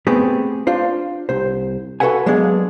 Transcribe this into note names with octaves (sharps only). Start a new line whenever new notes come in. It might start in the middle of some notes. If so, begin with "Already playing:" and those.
A3 B3 C4 G4 G#4
D4 F4 C5
C2 C5
F#4 A4 B4 E5 F#5 G#5
F#3 G#3 A#3 B3 D4 G#4